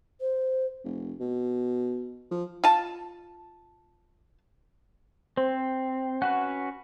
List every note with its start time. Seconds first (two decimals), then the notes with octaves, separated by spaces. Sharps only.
0.21 C5
0.84 F1
1.20 B2
2.31 F3
2.64 F4 A5
5.37 C4 C5
6.22 C#4 F#4 B4 F#5